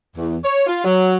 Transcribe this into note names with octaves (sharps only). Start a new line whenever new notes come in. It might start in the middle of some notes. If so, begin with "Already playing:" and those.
E2
C#5
F4
F#3